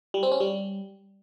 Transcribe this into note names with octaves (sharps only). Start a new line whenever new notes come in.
G3
C4
C#4
G3